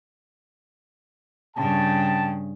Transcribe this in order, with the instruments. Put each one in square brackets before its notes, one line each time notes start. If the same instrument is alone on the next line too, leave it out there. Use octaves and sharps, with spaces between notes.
[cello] G2 C#3 [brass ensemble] G5 A5